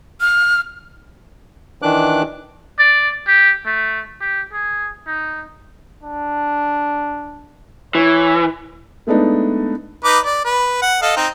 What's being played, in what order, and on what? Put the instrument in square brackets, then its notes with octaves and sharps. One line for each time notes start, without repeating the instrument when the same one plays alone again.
[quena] F6
[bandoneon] D#3 E3 D4 D6 F#6
[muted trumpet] D5
G4
A3
G4
G#4
D#4
D4
[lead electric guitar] E3 [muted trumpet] C#5
[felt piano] G#3 A3 B3 D4 D#4
[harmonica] D#4 B4 D6
D5
B4
F#5
A4 D#5 F5
C4 D#4